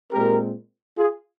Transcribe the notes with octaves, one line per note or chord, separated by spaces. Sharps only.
A#2 G#3 C4 G4 A#4
F4 G#4